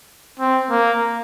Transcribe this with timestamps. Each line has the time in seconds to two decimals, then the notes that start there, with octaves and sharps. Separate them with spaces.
0.40 C4
0.70 A#3